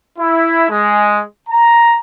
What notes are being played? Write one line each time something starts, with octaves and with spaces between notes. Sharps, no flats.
E4
G#3
A#5